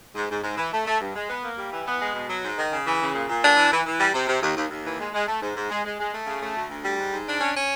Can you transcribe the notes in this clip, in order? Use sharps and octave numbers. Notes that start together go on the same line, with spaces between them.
G#2
G#2
G#2
E3
A3
A3
G2
G#3
B3
A#3
G3
E3
B3
G#3
B2
F#3
G#2
D#3
C#3
E3
C#3
A#2
A#2
D4
E3
E3
E3
G3
C3
C3
D#2
D#2
D#2
E3
G#3
G#3
A3
G#2
G#2
G#3
G#3
G#3
A3
C#3
A3
D2
D2
G3
G#2
G#2
D4
C#4
C#4